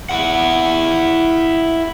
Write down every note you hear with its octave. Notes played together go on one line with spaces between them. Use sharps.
E4 F#5